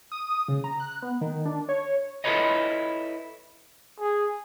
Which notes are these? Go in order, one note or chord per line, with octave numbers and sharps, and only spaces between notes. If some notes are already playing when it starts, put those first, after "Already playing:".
D#6
C#3
A#5
F#6
B3
D#3
D4
C#5
E4 F4 A4 B4 C#5 D#5
G#4